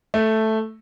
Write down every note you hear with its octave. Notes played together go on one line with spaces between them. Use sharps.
A3